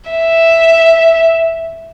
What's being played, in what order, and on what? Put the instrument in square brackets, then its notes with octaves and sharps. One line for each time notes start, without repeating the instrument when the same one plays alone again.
[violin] E5